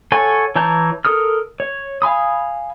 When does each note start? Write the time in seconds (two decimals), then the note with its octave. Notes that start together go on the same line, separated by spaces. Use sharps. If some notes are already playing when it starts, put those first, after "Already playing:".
0.12 A4 C#5 F#5 G#5 C#6
0.56 E3 C#5 A5 A#5 G6
1.05 A4 A#4 D#6 F6
1.60 C#5
2.02 F5 G#5 B5 D#6